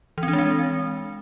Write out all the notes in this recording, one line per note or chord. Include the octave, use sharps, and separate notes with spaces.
E3
C4
D4
G#3
C4